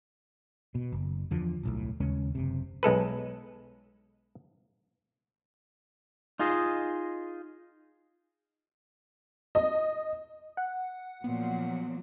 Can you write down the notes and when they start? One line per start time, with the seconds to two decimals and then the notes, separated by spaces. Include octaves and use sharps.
0.75 B2
0.92 F#1
1.31 E2 D3 F3
1.63 D1 B1 A2
2.00 D#2 C#3 G#3 C#4
2.35 F#1 C3
2.83 B1 G#3 A4 B4
6.39 D#4 F4 G#4 D#5
9.55 D#5
10.57 F#5
11.24 A#2 F3 F#3 B3